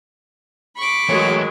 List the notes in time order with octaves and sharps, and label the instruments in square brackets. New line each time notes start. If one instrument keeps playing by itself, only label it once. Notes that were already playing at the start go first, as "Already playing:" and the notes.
[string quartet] B5 C#6 D6
[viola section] D#3 F#3 G#3 [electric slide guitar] E3 A3 C#5